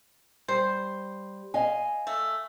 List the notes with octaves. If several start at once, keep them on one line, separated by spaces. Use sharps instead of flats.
G3 C5
D#5 F5 G#5
A3